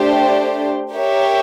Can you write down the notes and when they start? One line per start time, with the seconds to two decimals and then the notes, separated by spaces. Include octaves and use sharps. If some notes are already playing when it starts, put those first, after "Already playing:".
Already playing: A3 D4 G4 C5
0.93 G4 A#4 C#5 E5